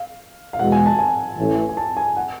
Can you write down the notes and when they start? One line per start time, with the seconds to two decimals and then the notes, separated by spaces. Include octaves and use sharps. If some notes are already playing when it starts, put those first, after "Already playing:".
Already playing: F5
0.53 F5
0.59 E2 B2 G#3 F#5
0.72 G#5
0.86 A5
0.99 G#5
1.38 A1 A2 E3
1.69 G#5
1.77 A5
1.97 G#5
2.17 F#5